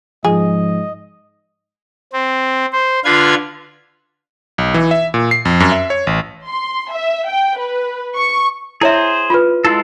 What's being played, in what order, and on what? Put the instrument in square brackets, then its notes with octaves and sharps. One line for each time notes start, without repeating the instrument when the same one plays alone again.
[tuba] G#2 [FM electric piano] F3 [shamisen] G#4 [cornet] D#5
[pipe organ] C4
C5
D3 F4 B4 F5 G#6
[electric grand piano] B1
E3
E5
A#2
C7
F2
F#2
E5
C#5
A1
[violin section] C6
E5
G5
B4
C#6
[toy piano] E4 C#5 E5 [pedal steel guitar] G#4 C5
[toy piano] F4 B4
[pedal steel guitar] G#3 F4 A4 [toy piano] E4